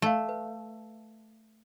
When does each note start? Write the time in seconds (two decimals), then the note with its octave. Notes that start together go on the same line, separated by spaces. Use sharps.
0.02 A3 D5 F5
0.29 B4